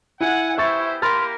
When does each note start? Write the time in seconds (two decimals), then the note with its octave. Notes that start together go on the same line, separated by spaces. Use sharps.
0.21 E4 F#5 G#5
0.58 B3 E4 G4 C5 E5 C#6 A6
1.02 A#3 G4 A#4 B5 C6 F6 A6